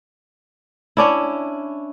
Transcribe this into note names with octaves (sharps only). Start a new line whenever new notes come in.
C#4 D4 E4